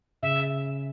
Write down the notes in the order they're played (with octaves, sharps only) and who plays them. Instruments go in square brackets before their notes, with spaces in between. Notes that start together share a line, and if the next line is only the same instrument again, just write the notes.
[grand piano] C#3 [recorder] E5